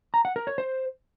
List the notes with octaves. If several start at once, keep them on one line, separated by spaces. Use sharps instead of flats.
A#5
F#5
A#4
C#5
C5